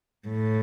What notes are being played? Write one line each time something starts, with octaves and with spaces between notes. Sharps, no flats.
A2